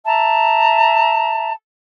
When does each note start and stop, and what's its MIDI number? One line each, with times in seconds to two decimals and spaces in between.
0.06 1.53 76
0.06 1.53 81
0.06 1.53 82